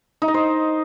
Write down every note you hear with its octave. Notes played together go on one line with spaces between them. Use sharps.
D#4
D#5
C5